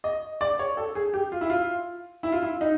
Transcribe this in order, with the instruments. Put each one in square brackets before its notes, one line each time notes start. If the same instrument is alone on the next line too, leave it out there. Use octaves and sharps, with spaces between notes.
[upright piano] D#5
D5
C#5
A4
G#4
G4
F4
E4
F4
E4
F4
E4
D#4